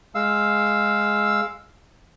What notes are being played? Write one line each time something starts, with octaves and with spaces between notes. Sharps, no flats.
G#3 F5 E6